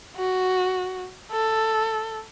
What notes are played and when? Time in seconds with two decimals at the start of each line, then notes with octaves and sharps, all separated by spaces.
0.16 F#4
1.32 A4